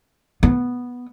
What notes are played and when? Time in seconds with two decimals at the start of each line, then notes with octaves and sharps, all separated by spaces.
0.43 B3